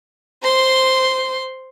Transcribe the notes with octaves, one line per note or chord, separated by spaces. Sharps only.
C5 C6